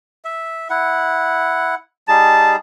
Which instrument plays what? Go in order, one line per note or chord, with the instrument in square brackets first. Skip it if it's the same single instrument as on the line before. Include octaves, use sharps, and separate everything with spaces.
[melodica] E5
E4 F#5
[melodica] G3 D#4 G#4 [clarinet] A5